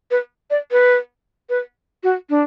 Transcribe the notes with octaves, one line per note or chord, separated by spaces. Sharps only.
B4
D5
B4
B4
F#4
D4